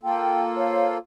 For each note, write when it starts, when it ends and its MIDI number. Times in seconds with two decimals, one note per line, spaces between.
0.03 0.98 58
0.03 0.98 65
0.03 0.98 69
0.03 0.43 79
0.56 0.95 72
0.56 0.95 73
0.56 0.95 77